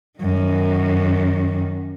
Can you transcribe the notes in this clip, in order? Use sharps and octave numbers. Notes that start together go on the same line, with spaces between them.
F#2 D#3